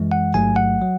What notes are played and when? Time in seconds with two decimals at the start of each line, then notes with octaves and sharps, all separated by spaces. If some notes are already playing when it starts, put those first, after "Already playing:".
Already playing: F#2 E3 G#3
0.12 F#5
0.34 A1 G#2 F#3 A3 G#5
0.56 F#5
0.81 F#3